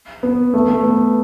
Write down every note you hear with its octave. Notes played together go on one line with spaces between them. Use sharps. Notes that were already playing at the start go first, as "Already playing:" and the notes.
B3
A3
A3
B3